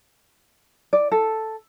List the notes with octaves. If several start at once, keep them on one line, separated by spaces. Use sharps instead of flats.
D5
A4